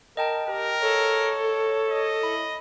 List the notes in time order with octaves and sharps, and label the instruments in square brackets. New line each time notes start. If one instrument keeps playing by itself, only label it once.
[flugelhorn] A#4 [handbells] D#5 G5 A5
[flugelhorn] G4 [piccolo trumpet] A#4
[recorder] A4 [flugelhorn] C#5
[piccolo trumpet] D#5
[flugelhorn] E4 [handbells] B5